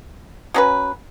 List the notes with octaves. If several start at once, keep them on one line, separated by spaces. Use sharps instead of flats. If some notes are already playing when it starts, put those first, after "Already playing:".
F#3 C#4 G#4 B4